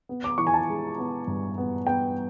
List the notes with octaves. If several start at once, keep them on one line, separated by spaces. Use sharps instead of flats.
B3
D6
E3 C#6
G#5
A5
G#3
B3
G2
B3
B3 G5